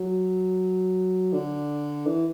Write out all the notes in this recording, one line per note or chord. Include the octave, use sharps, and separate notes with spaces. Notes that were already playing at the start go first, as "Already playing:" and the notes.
Already playing: F#3
D3
E3